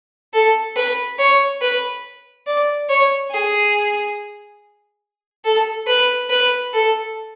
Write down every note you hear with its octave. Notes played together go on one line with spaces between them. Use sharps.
A4
B4
C#5
B4
D5
C#5
G#4
A4
B4
B4
A4